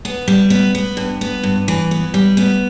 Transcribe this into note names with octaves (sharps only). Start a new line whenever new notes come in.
B3
G3
B3
B3
G2
B3
G2
E3
B3
G3
B3